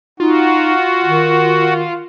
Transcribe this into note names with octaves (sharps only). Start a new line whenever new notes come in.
D#4 F4 F#4
D#3